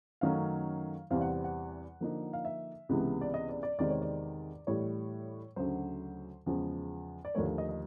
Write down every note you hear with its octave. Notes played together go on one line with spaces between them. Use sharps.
F#2 D#3 F#3 A3 C#4 F5
E2 C3 E3 G3 C4 F5
F#5
F#5
F#5
D3 F3 A#3 D#4
F5
E5
C#2 C3 E3 G#3 B3
D5
D#5
D5
D5
E2 C3 D#3 G#3 C4 D5
C#5
D5
A2 E3 G3 C#5
D2 C#3 F#3 C5
E2 C#3 F3 G#3
D5
D#2 D3 F3 A3 C#5
D#5
D#5